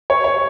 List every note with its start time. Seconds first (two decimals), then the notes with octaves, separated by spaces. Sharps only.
0.10 C#5
0.24 C#5